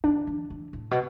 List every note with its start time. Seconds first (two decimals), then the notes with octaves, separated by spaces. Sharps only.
0.04 D3 D4
0.27 E3
0.50 E3
0.73 A2
0.91 B2